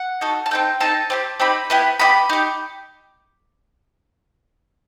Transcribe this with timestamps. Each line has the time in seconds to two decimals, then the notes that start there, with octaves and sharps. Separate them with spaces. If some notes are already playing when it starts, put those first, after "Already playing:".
Already playing: F#5
0.21 D#4 F#4 A4
0.46 A5
0.51 C4 D#4 A4 G5
0.80 C4 D#4 A4 A5
1.10 C4 D#4 G4
1.40 C4 D#4 G4 B5
1.70 B3 E4 G4
2.00 B3 E4 G4 B5
2.29 D#4 G4